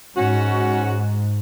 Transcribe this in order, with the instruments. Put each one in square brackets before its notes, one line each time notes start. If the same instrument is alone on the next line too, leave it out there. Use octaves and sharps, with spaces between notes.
[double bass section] G#2 [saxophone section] C#4 F#4